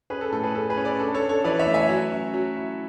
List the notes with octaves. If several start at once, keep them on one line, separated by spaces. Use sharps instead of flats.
C#4 G#4 B4
A4
A2 A4
G#4 B4
C#4 A4
G#4 B4
C#4
B4 D5
D4 A4
A4 C#5
D4
A4 C#5
E3 B4 D5
C#5 E5
A3
E5 G#5
F#3
C#4
F#3
E4